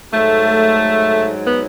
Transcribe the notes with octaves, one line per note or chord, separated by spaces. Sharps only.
G#2 F#3 A3
B3